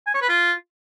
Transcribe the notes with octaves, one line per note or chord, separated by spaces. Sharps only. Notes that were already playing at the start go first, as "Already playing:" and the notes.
G#5
C#5
B4
F4